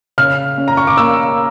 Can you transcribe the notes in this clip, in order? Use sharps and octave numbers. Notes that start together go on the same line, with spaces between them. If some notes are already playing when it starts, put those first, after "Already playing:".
C#3 F6
C#4
A#5
C#6
D6
A#3 E6